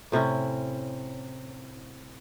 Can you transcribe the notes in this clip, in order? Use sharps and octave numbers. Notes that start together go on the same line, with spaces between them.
A2 C3 C#4 E4